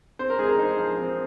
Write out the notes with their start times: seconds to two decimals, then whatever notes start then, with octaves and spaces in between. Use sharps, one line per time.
0.19 C4 C5
0.30 A#4
0.39 G#3 G#4
0.49 A#4
0.58 D#4 C5
0.78 F3
0.98 C4